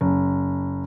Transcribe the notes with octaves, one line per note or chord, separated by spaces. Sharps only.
F#1